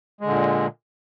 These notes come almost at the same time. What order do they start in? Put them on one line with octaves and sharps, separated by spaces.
G#3 D3 A#2